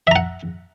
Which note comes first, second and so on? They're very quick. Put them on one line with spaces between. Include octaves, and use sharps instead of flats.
E5 A#5 F#5